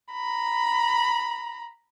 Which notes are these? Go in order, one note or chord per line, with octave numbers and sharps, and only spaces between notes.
A#5 B5